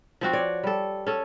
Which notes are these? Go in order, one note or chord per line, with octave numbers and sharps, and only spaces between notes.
F3 C4 F#4
C#5 D5
G3 A4
C#4 A4